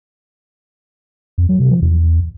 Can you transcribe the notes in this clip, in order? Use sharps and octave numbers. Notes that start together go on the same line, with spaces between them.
F2
F#3
C3
F3
E2